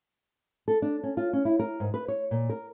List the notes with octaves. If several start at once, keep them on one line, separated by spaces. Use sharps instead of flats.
A4
D4
C#4
F4
C#4
E4
A#4
G#2
B4
C#5
A#2
A#4